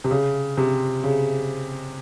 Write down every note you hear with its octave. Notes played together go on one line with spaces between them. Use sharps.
C3
C#3
C3
C#3